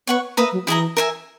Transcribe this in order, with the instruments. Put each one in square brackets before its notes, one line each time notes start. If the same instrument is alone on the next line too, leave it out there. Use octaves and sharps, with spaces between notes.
[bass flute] B3 [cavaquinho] C#5 F#5 C#6
[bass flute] A#3 [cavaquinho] B4 E5 A#5 D#6
[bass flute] F#3
[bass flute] E3 [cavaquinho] E4 G#4 D#5 A#5
[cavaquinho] A#4 E5 G#5